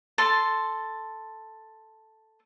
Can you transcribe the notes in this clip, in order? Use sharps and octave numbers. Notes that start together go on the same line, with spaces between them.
A4 A5 C6